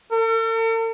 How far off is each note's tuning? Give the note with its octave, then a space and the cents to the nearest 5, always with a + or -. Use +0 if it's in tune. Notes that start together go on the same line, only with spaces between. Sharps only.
A4 +45